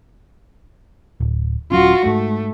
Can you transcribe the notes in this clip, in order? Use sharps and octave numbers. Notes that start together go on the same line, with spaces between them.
D1
D#1 F#3 C#4 F4 F#4
G#2 A3